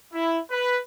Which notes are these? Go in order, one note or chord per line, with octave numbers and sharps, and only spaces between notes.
E4
B4